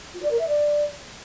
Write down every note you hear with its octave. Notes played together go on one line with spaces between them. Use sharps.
F4
D5
A#4
E5
D5